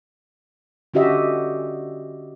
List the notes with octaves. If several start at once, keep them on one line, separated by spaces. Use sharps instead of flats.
D3 C#4 F#4 G4 D#5 E5